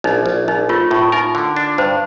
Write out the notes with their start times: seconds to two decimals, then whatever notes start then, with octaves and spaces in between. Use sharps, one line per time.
0.04 A#1 D#4
0.26 A#1
0.48 A#1 D#4
0.69 A3 F4
0.91 A2 F4
1.12 D#4 A#4
1.35 D3
1.57 D4
1.78 G2 C5